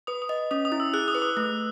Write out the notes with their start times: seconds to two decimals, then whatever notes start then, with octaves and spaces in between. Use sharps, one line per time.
0.07 B4 D#6
0.22 D#6
0.29 D#5
0.51 C#4 D#6
0.65 D#6
0.72 E4
0.80 E6
0.94 G#4 F#6
1.08 D#6
1.15 B4
1.22 D#6
1.37 A3